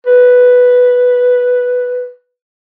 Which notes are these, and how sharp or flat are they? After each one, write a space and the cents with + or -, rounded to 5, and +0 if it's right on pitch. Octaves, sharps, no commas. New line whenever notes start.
B4 +0